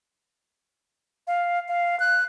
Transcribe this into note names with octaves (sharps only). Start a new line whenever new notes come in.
F5
F5
F#6